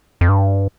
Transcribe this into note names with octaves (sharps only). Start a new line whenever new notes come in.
F2
G2